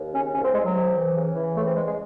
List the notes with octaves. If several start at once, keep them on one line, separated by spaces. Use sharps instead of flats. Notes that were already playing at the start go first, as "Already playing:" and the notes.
Already playing: D#2
C#3 C#4
C2 C#4
C4
C2 G#3
F#3
C3
E3
C#3
E3
C#3 A3
C4
E2 G#3
G#3